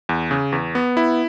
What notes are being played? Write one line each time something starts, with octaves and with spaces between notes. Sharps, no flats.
E2
C#3
E2
B3
E4